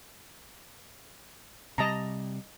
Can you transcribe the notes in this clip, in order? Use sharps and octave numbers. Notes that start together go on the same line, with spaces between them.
C3 G3 D#5 A5 A#5